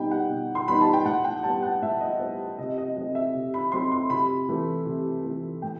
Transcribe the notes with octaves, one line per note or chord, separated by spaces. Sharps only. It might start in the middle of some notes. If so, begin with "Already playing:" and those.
Already playing: B2 G3 B3 D#4 G5 B5
F#5
B2
C6
G3 B3 D#4 B5
A5
G5
A2 F#5
G5
G3 B3 A5
F#5
A2 E5
D#5
G3 B3 C5
C3 D#5
D#5
F#3 A3 C4 D#5
E5
C3
B5
F#3 A3 C4 C6
C6
C3 B5
E3 A3
C3
E3 A3
A2 G5